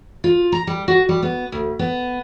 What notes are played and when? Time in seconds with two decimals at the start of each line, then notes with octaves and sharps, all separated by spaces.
0.24 F4
0.52 A#5
0.67 G3
0.88 F#4
1.09 G3
1.23 B3
1.52 D2
1.79 B3